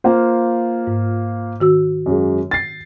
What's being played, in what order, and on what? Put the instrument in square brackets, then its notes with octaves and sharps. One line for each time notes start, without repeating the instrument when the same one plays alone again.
[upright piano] A#3 F4 C5
[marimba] G#2
D#3 F#4 E6
[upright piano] F#2 F#3 G#3
A6 C7